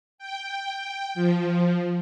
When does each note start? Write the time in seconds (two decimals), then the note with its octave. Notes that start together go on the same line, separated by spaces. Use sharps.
0.18 G5
1.15 F3